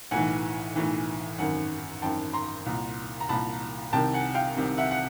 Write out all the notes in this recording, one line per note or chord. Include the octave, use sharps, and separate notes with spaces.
B1 A2 E3 F#5 G#5
B1 A2 E3
G#1 F#2 D#3 F#5 G#5
G#1 F#2 D#3 G5 A5
A#5 C6
C2 A#2
A#5
C2 A#2 A5 B5
C2 C3 D#3 G5 A5
F#5 G#5
F5 G5
C2 C3 D#3
E5 F#5
F#5